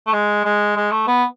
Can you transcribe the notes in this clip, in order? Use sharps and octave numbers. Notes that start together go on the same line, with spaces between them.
A3
G#3
G#3
G#3
A3
B3